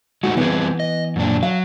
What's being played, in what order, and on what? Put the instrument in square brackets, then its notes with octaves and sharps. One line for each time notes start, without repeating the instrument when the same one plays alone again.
[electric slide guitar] G#3 A3 D#4 [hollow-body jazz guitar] F#4
[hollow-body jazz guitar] E3 B3 [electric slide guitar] G3 C4 G#4
[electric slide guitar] D#5
F#2 A#2 D4
[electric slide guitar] F#3 [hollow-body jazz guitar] F5